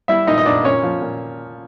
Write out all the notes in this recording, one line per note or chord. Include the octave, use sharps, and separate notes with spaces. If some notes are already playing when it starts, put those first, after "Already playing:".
G3 E4 E5
A#2 D#4 D#5
D#5
A#2 D4 D5
A#2 C#4 C#5
F3
A#2